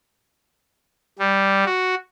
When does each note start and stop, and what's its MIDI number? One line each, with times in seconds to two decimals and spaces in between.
1.19 1.65 55
1.66 1.95 66